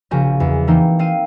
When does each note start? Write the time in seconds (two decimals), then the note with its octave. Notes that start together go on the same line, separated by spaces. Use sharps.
0.11 A#1 C#3 A#3 F#4 G#5 G6
0.40 E2
0.67 E3 A#3 C4 D#4
0.99 C4 F5 D#7